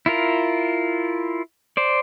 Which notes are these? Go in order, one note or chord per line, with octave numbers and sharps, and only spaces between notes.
E4 F4 A#4
C5 D5